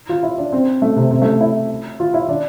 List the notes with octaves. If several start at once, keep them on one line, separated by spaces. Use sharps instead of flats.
F4
E4
D4
C4
A3
C3
C3
A3
E4
F4
E4
D4